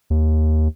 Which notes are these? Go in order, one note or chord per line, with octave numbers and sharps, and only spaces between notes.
D#2